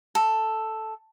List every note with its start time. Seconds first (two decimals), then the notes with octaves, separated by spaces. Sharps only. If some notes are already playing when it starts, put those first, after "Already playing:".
0.15 A4